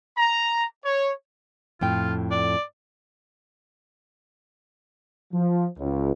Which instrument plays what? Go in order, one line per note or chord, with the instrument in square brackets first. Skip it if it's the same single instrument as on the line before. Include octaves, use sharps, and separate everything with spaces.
[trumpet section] A#5
C#5
[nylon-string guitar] F2 A2 G5 [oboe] F4
[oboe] D5
[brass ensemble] F3
C#2